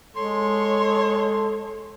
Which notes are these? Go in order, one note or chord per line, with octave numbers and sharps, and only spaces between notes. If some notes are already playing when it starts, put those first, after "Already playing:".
G#3 A4 C#5 C6